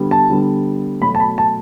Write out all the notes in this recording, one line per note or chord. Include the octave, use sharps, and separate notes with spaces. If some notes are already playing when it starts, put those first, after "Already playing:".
Already playing: D3 G3 B3
A5
D3 G3 B3
B2 F#3 A3 B5
A5
B5
A5